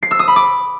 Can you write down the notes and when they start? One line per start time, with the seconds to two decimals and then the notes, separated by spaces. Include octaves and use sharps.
0.03 C7
0.11 E6
0.19 D#6
0.28 B5
0.36 D6